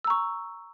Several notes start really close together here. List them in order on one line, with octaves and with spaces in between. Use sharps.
E6 A#5 C#6